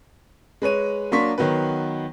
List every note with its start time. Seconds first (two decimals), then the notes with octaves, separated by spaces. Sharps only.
0.62 G#3 B4 C#5 D#7
1.12 F#3 A#3 D4 C6 C#6 B6
1.38 D#3 F#3 B3 B4